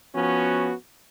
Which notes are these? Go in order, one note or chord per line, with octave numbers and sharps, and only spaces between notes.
F3 B3 C#4 F#4